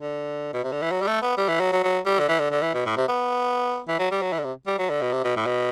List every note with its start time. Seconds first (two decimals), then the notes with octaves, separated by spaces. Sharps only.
0.01 D3
0.54 B2
0.64 C3
0.72 D3
0.82 E3
0.92 F#3
1.02 G3
1.08 A3
1.22 B3
1.37 G3
1.49 E3
1.60 F#3
1.72 F#3
1.83 F#3
2.06 G3
2.19 D3
2.29 E3
2.40 D3
2.51 D3
2.62 E3
2.74 B2
2.86 A2
2.97 C3
3.08 B3
3.88 E3
3.99 F#3
4.11 G3
4.22 F#3
4.33 E3
4.39 D3
4.44 C3
4.67 G3
4.79 F#3
4.90 D3
5.01 B2
5.13 C3
5.24 B2
5.36 A2
5.47 B2